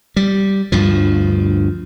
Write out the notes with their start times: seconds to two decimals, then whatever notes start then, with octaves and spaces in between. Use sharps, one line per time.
0.16 G3
0.72 D2 G2 F3